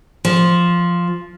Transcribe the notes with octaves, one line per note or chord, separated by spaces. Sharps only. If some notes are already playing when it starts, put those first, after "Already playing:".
F3